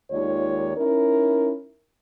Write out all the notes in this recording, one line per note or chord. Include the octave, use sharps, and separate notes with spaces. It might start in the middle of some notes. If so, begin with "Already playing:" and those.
D#2 D#3 G#3 F4 C#5 D5
C#4 D#4 E4 A#4